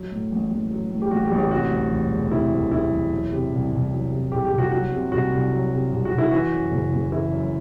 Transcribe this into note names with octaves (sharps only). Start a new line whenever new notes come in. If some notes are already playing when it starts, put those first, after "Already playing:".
Already playing: F#3
A2
A1
A1
F#3
A2
G4
A1 F#4
G4
A1
G4
C3 F#4
D2
E1
E1
C3 E4
D2
E1 E4
E1
F#3
C3
C2
C2
F#3
C3
C2 G4
G4
C2
F#4
F#3 F#4
C3
C2 F#4
C2
F#3
C3
C2
F#4
C2
E4
E3 F#4
F#2
F#1
F#1
E3 E4
F#2